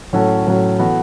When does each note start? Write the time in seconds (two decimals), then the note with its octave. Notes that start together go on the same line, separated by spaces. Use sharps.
0.13 A2 F#3 C#4 F#4 A4
0.46 A2 F#3 C#4 F#4 A4
0.79 E3 B3 F#4 A4